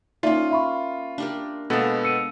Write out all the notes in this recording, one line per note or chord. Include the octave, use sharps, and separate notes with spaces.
A#3 C#4 D#4 F4 D5 E5
E5 B5 C#6
D4 G4 A#4
B2 G#3 A#3 B3 A4
E6 C#7 D#7